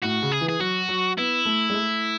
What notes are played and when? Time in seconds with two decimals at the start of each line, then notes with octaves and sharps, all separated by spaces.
0.02 A2 F#4
0.22 C#3
0.31 G#4
0.41 E3
0.49 G#4
0.60 F#3 F#4
0.89 F#3
1.17 B3 E4
1.45 A3
1.70 G#3
1.74 A3